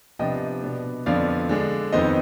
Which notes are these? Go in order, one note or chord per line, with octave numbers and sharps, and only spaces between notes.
C3 F3 B3 D4 D#5 G5
B2 B3 D4
F2 D3 F3 B3 D5 F5
D3 G#3 D4
F2 D#3 B3 C5 D#5